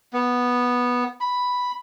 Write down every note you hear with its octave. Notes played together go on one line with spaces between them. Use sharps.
B3
B5